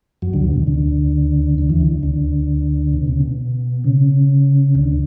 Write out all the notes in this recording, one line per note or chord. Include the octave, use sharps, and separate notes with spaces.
F#2 F#3
D2 D3
B2
D2 D3
D2 D3
D2 D3
E2 E3
D2 D3
D2 D3
B2
C#3
B2
C#3
D2 D3